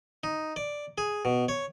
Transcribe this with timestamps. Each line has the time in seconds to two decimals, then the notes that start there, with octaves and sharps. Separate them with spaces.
0.24 D#4
0.56 D5
0.98 G#4
1.25 B2
1.49 C#5